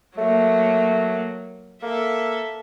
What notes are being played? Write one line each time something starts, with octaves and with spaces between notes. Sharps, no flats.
F#3 A3 A#3
A#3 A4 E5